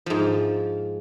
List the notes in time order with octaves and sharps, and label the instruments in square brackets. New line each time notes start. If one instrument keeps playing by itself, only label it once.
[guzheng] G#2 F3